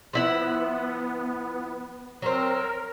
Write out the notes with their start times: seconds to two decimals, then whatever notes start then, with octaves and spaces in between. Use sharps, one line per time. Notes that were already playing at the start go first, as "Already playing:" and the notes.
0.13 F3 B3 E4 F#5
2.22 F#3 C4 A#4